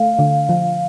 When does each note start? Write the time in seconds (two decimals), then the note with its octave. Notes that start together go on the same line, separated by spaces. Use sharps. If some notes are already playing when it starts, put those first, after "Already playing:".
Already playing: A3 F5
0.19 D3
0.49 F3